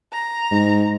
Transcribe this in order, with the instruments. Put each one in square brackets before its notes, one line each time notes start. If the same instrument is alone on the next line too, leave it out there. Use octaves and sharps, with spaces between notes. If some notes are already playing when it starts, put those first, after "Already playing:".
[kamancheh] A#5
[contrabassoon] G#2